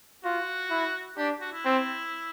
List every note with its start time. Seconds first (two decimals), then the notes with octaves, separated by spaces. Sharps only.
0.24 F4 F#4
0.70 E4
1.17 D4 G4
1.41 F#4
1.52 E4
1.65 C4